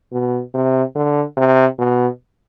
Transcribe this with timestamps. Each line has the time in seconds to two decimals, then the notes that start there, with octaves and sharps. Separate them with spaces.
0.12 B2
0.54 C3
0.95 D3
1.37 C3
1.78 B2